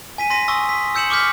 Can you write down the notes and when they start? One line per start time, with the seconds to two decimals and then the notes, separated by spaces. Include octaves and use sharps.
0.18 G#5 B6 D#7
0.30 C6 A#6 B6 D#7
0.48 G#5 C6 C#6 D#6 E6 A#6
0.69 B6
0.95 E6 G6 C#7 E7 F#7
1.10 C#6 D6 F6 G6 B6